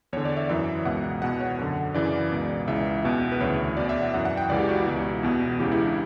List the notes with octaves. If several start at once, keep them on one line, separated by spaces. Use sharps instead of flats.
E2 D3 C#5
D5
E5
F#2 E3 E5
C#2 B2 F#5
E2 B2 F#5
C#5
F#2 D3
F#2 C#3 E3 D5
C#2 B2
C#2 C#3 E3 E5
E2 B2
B4
D2 C#3 E3 C#5
E2 B2 D5
E5
F#5
F#2 E3 F#5
F#5
G5
C#2 C#3 E3 D5
G4
F#4
E4
C#2 B2
E2 B2
C#2 C#3 E3 G4
E4
D4